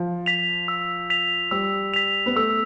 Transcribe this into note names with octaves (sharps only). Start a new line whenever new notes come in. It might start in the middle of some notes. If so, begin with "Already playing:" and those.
Already playing: F3
B6 F7
E6
B6 F7
G3 E6
B6 F7
B3
A3 E6